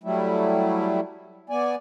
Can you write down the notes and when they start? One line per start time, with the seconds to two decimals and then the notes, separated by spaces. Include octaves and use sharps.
0.04 F#3 G3 A3 E4
1.50 B3 D5 G#5